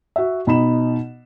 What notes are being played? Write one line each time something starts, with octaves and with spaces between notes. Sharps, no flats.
F#4 E5
B2 D#4 B5 E7